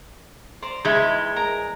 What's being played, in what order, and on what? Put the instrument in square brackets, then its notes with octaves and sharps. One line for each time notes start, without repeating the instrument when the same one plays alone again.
[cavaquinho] C5 D5 A#5
[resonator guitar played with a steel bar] E2 G#3 [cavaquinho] D#4 E4 C5
[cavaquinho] A#4 A#5